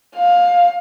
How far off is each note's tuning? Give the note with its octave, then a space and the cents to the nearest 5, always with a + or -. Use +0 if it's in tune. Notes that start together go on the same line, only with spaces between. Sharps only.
F5 +15